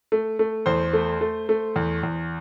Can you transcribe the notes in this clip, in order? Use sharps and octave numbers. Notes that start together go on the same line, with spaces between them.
A3
A3
E2 C5
A3
A3
A3
E2
E2